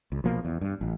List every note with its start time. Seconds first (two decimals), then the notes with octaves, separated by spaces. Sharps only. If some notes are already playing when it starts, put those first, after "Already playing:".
0.12 C#2
0.24 A#1 B2 F3 A#3
0.45 E2
0.61 G2
0.81 A1